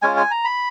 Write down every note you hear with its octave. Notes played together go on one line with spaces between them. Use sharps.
G#3 C#4 F4 G#5
G#5
A#5
B5